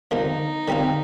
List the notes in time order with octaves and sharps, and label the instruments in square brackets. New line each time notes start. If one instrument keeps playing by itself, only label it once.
[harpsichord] D#2 D3 F3 [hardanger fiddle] D#4
[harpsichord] D3 G3 C4 F4